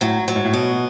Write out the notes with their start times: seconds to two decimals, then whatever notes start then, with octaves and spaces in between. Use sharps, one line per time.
0.01 A2 F#3
0.28 F#3
0.36 G#2
0.45 A2
0.53 B2 B3